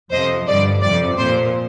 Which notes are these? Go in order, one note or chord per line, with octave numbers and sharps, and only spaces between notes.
F2 C3 F3 C5 D#5
G2 D3 F3 D5
F2 C3 F3 D5
A#2 F3 C5